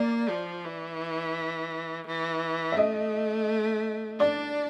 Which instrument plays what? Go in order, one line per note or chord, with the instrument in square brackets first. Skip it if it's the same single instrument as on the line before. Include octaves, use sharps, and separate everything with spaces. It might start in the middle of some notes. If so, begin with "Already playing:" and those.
Already playing: [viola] A#3 [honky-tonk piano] D5
[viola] F3
E3
E3
[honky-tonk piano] E5
[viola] A3 [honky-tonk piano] D#5
[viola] D4 [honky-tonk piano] D5